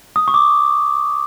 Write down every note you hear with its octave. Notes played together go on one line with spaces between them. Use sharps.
D#6
C#6
D6